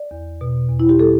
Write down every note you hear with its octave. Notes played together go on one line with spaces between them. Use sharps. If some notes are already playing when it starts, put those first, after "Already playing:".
Already playing: D5
E2
B2
E2
E4
G4
G3 A4